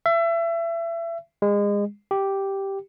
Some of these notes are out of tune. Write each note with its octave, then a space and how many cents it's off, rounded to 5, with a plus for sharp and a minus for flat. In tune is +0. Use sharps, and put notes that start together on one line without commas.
E5 +30
G#3 -30
G4 -5